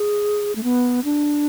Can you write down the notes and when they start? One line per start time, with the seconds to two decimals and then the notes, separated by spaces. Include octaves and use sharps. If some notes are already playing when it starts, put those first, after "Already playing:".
Already playing: G#4
0.55 A3
0.64 B3
1.05 D4